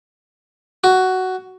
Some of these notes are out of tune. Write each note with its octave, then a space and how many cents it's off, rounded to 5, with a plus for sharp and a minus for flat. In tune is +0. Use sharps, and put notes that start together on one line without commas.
F#4 +10